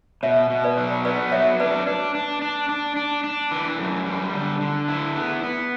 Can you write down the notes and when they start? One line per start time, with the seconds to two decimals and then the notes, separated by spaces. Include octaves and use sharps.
0.23 B2 C#5 E5
0.50 B2
0.64 B4 D5
0.78 F#3
1.05 B3 B4 D5
1.32 F#3 C#5 E5
1.60 D4 B4 D5
1.86 D4 B4 D5
2.15 D4
2.42 D4
2.69 D4
2.96 D4
3.24 D4
3.51 E3
3.79 F#2
4.06 G3
4.33 D3
4.61 D3
4.88 E4
5.16 B3
5.43 B3